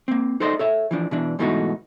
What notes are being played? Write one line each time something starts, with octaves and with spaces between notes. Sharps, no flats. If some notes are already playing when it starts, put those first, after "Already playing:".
A#3 C4
D#4 A4 C5 D5 D#5
A4 C#5 E5
E3 F3 D4
B2 E3 D4
G#2 B2 E3 A3 D#4 F#4